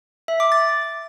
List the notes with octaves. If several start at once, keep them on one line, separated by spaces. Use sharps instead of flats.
E5
D6
A6